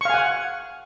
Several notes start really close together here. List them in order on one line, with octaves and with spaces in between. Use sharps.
C#6 F5 G#5 F#5